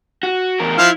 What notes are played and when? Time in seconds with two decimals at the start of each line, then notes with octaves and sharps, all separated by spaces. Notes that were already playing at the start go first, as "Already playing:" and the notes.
0.23 F#4
0.60 E2 A#4
0.78 F3 E4 F5 F6